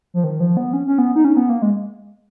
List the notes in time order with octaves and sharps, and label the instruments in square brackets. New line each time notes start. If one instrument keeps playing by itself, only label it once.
[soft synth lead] F3
D#3
F3
B3
C#4
C#4
B3
D#4
C#4
B3
A#3
G#3